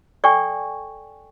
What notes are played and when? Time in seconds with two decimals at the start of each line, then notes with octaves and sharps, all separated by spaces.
0.24 A4 D5 G5 G#5 C#6